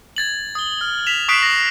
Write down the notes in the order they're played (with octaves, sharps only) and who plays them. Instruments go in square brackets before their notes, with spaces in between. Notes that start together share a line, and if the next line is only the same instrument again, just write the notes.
[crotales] G#6 A6 F#7
D#6 G7
F6
B6 E7 F7
C#6 D#6 F#6 B6 C7 D7
A#6